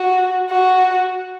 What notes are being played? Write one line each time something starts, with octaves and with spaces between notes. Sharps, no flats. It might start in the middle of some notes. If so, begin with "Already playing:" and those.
Already playing: F#4
F#4